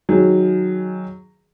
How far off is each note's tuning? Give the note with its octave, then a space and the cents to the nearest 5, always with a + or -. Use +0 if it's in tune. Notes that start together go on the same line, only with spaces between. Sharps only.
D#3 +0 F#3 +0 G#4 +0